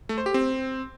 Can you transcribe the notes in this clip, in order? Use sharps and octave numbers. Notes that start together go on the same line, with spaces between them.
A3
C5
G4
C4